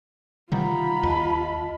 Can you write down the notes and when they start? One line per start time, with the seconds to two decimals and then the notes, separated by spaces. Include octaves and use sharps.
0.52 C3 D#3 G3 F4 F#5 A#5 B5
1.03 D#2 D#5 A5